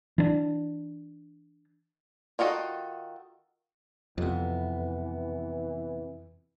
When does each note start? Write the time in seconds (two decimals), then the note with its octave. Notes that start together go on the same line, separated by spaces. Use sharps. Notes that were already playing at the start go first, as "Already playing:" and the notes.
0.18 E3 D4
2.39 D#3 F4 F#4 A4 D#5
4.18 F2 C3 E3 B3